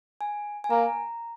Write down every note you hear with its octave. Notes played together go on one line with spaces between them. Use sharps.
G#5
G#5
A#3 A#5